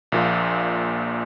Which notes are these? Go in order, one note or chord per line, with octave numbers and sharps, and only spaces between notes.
A#1 A#2 F4